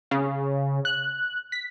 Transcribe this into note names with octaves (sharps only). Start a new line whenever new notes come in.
C#3
F#6
B6